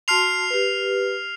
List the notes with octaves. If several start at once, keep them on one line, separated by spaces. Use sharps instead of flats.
F#4 A5 C6 F6 C7 F7
G4 B4